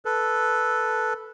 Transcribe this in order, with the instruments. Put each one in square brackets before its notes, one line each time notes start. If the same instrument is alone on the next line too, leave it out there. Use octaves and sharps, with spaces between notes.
[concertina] A4 B4